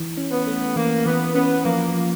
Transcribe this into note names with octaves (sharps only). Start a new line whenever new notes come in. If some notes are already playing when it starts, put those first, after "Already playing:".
Already playing: E3
C#4
B3
A3
E3 A#3
E3 B3
B3 C#4
F3 A#3
F3